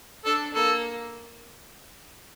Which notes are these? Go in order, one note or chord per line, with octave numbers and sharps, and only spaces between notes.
D4 A4
A#3 A4